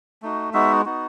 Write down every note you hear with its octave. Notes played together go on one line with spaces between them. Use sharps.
A3 D#4 F#4
G#3 B3 D#4 F#4 E5
B3 D#4 F#4